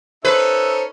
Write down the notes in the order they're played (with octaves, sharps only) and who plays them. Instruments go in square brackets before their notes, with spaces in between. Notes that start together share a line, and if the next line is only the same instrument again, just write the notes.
[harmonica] C#4 D#4 A4 [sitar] B4 [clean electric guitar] C5 [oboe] E5